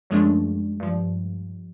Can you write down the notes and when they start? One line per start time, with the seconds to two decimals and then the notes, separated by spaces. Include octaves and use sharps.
0.10 F#2 F3 G#3 A3 D4
0.80 G2 F3